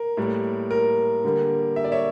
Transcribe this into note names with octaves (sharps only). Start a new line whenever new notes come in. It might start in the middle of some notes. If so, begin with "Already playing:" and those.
Already playing: A#4
A2 G3 A#3
A#4
D3 G3 A#3
E5
D5
C#5 E5